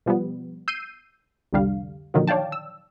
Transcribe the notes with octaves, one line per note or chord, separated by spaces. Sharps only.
B2 F3 G3 B3
E6 G6 C7 D#7
C2 F2 D3 G3 F5
A#2 D3 D#3 F3 F#3
C#5 D5 F5 G5 A5
E6